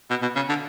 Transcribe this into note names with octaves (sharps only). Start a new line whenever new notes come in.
B2
B2
C#3
D3